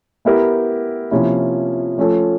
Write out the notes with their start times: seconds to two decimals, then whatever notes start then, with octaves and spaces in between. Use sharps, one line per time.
0.25 B3 E4 G4 A#4
1.11 C3 F3 A#3 C#4 E4
1.98 F3 A3 C#4 F4 A4